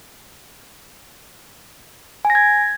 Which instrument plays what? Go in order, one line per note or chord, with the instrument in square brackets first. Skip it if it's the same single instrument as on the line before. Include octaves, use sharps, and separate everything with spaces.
[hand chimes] G#5
A#6
G#6